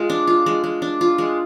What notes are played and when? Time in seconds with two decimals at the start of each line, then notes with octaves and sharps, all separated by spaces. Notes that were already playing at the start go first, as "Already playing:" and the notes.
Already playing: G#3 F4
0.10 D4
0.27 F4
0.46 G#3
0.64 G#3
0.82 D4
1.01 F4
1.18 G#3